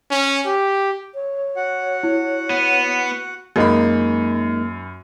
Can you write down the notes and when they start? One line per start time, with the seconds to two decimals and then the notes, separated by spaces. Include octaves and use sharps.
0.11 C#4
0.46 G4
1.15 C#5
1.56 F#4 F#5
2.03 E4
2.50 B3
3.56 F#2 G#3 A#3 D#4 B5